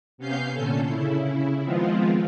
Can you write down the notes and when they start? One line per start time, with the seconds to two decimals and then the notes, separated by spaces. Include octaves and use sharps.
0.18 C3 B3 C#4 F5 G6 C7
0.53 A#2 D3 C#4 A4
0.88 C#3 E4
1.64 D#3 F3 G#3 B3 C4 F4